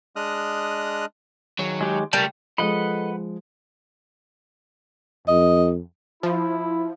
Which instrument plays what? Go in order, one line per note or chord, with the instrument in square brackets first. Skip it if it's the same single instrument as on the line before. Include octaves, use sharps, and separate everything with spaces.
[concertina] G#3 D4 D#5 D#6 F6 F#6
[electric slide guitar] D#3 G#4 C#5 [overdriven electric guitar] F#3
[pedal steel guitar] G#3 G4
[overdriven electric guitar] C#2 A3 [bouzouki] G3 [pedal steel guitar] A#4 A5
[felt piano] F3 G#3 [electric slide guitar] A4 D#5 [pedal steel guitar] B4 F#5 B5
[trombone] F2 [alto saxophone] D#5
[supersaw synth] F3 [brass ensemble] E4